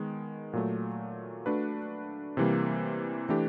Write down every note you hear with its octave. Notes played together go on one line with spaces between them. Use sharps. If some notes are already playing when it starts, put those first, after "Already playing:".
Already playing: D#3 G#3 B3
A#2 F#3 A3
A3 D4 F#4 B4
C3 E3 G3 A#3
E3 A3 D4 G4